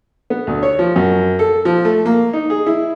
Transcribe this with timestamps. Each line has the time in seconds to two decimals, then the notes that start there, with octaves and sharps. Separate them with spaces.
0.30 B3
0.47 D2
0.63 C#5
0.79 F3
0.96 F#2
1.39 A4
1.65 F3
1.85 A3
2.06 A#3
2.33 D#4
2.50 G#4
2.66 E4